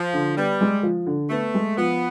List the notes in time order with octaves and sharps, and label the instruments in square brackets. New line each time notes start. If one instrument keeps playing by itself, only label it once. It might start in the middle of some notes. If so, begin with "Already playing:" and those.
Already playing: [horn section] F3
[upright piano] D3
[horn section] G3 [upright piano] B3
[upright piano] G#3
F3
D3
[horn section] A3 [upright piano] B3
[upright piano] G#3
[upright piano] F3 [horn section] B3